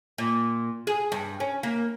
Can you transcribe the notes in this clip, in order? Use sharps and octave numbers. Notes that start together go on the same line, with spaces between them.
A#2
G#4
G2
C#4
A#3